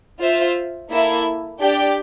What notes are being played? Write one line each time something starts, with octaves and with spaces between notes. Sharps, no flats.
F4 C5 E5
A#3 E4 A4 E5
D4 G4 D5 G5